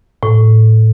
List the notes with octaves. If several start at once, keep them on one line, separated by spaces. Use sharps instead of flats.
A2